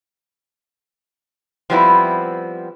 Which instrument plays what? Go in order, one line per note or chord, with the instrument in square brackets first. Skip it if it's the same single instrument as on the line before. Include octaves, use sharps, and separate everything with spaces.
[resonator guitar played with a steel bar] F3 G3 B3 C4 E4